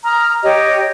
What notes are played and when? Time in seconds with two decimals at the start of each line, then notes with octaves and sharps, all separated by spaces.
0.04 A#5 D#6 F6
0.43 G4 C#5 D#5